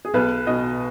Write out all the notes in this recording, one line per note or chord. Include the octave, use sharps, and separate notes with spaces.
G#4
B1 B4
B2 D#5